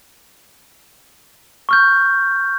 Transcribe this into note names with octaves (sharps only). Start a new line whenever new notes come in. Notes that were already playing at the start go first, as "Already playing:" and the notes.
C#6 F6 G6